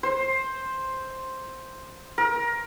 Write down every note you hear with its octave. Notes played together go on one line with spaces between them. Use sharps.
C5
A#4